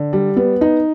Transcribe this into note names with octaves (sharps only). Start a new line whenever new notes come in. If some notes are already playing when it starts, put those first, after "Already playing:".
Already playing: D3
G3
B3
D#4